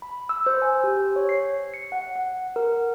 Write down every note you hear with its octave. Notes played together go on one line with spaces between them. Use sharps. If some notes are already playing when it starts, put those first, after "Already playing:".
B5
E6
C5
G#5
G4
C#5
C7
C#7
F#5
F#5
A#4